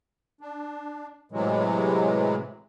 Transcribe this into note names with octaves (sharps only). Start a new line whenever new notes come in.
D4
A2 C3 E3 F#3 G#3